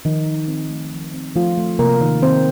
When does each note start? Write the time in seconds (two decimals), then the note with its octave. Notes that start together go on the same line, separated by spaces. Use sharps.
0.05 D#3 F3 D#4
0.26 F3
0.48 C4
0.70 A3
0.93 F3
1.14 C4
1.36 F3 A3 F4
1.57 A3
1.79 C3 A#3 A#4
2.01 D#3
2.22 D#3 C4 C5